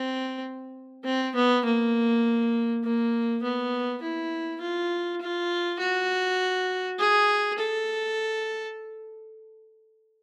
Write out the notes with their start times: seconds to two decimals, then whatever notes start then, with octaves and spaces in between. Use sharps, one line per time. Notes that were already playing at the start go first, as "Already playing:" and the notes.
Already playing: C4
1.04 C4
1.35 B3
1.65 A#3
2.84 A#3
3.43 B3
4.02 E4
4.61 F4
5.21 F4
5.80 F#4
6.99 G#4
7.59 A4